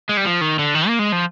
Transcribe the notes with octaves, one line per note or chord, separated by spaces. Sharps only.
G#3
G3
F3
D#3
D3
D#3
A#3
G#3
F3